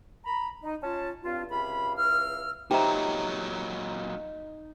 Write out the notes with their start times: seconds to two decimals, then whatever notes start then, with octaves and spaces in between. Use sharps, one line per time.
0.24 A#5 B5
0.62 D#4
0.82 C#4 F4 A5
1.24 G2 C4 F4
1.50 C#2 C3 F5 B5
1.97 C#2 E3 F5 E6 F6
2.71 A#2 F#3 D#4 G4 C5 E5 G5 A#5